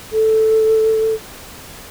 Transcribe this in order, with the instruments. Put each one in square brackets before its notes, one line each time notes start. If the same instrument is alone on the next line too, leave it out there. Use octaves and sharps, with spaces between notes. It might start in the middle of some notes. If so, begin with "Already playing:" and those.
[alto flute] A4